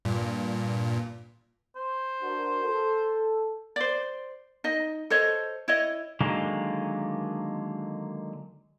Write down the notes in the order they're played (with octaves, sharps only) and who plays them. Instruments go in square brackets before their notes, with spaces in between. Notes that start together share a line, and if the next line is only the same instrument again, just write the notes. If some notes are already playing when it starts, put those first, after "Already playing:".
[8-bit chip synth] G2 A#2
[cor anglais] C5
[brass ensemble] D4 F#4 A#4
A4
[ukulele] C5 D5
D#4 D#5
A4 C5 C#5 D#5
E4 C#5 D#5
[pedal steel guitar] D3 D#3 F#3 G#3 A#3